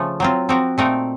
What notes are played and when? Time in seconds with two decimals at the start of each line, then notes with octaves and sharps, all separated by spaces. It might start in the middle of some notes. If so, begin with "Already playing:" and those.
Already playing: C#3 F3 A3
0.20 F#3 C4 F4
0.49 F3 C4 F#4 A#4
0.78 A#2 A3 C4 D#4 A#4